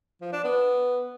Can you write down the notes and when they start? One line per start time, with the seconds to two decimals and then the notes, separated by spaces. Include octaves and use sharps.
0.21 F3
0.33 D4
0.44 B3